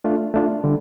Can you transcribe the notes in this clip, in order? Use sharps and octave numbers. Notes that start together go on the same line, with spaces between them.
A3 D4 F4
A3 D4 F4
D3 G3